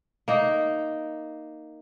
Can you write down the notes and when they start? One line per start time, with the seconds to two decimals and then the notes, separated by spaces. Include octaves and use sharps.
0.28 A#3 D#4